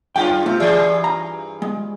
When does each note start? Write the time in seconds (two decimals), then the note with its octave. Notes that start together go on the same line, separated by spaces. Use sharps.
0.16 F#2 F4 G5
0.46 C3 A3 F4
0.60 G2 E3 G#4 D5
1.04 A#5
1.62 G#3